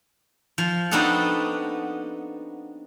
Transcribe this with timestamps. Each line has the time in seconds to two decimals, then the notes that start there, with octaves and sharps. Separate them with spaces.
0.58 F3
0.91 B3 C4 D4 D#4 F#4 A4